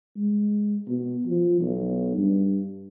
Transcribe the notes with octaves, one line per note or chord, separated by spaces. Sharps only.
G#3
B2
F3
B1
G2